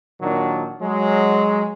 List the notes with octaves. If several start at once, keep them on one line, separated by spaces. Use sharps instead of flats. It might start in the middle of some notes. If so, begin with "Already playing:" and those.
A#2 D#3 F#3 D4
F#3 G#3